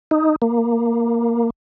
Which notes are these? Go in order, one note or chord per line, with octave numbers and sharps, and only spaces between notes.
D#4
A#3